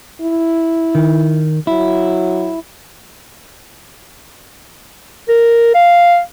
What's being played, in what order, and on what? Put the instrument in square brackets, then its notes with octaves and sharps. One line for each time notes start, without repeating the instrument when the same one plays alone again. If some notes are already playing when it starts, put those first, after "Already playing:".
[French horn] E4
[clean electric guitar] D#3
[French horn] F#3 [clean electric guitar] E4
[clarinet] A#4
F5